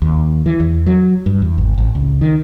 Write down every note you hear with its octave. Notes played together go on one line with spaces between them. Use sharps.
D#2
E3
E2
F#3
G2
E2
G#1
A1
C#2
D#3